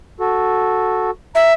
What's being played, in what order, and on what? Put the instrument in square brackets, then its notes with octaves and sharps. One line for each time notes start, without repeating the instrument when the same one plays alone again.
[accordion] F#4 A4
[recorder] E5 [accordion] A#5